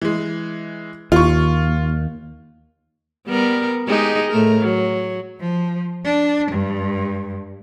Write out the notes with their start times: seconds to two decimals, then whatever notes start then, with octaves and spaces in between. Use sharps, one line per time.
0.02 E3 G#3
1.12 D#2 F4 C#6
3.28 G3 B3 A#4
3.88 G#3 D#4 G4
4.31 A2 A3 A#4
4.61 F#3
5.39 F3
6.05 D4
6.52 G2